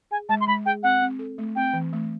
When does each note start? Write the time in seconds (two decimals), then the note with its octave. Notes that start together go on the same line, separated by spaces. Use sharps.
0.11 G#4 G#5
0.29 G#3 A5
0.41 C6
0.47 G#3 B5
0.66 G#4 G5
0.83 C4 F#5
1.02 C4
1.19 A4
1.38 A3
1.56 C4 G5
1.73 E3
1.93 A3